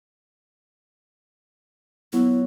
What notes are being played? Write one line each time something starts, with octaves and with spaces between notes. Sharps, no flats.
F#3 B3 E4 F4